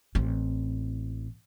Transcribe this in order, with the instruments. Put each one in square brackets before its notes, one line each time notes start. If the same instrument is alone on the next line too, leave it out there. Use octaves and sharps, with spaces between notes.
[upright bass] A1 C4